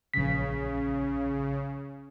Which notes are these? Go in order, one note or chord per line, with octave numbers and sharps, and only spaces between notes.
A#1 C#3 B6